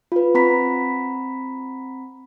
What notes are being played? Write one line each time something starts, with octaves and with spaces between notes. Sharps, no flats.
F4 B4
C4 A#5 B5 B6